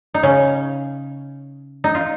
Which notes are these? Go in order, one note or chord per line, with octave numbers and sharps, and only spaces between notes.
D#4
C#3 C#4
D#4
F4